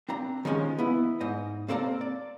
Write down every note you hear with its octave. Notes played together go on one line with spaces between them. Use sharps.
C4 D4 A#5
D#3 F3 G#3 C#4
B3 E4
G#2 D#5
A#3 C4 A4 D5 A#5
D5